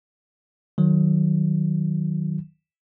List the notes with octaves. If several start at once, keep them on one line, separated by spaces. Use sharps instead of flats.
D#3 F#3